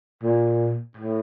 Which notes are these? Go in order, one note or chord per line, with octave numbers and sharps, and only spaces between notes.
A#2
A2